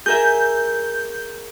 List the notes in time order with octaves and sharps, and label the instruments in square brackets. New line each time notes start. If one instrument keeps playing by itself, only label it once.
[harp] G#4 A#4 E5 [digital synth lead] G6